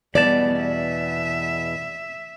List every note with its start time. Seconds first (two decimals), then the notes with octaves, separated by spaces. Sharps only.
0.15 E2 B2 G3 B3 D5 A5
0.60 E5